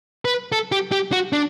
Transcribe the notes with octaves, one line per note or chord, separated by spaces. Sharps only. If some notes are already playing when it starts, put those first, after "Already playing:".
B4
A4
G4
G4
F#4
D4